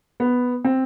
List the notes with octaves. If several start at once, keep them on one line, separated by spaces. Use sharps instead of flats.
B3
C4